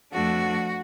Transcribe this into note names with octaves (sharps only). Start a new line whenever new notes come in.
F2 F3 A3 D4 F#4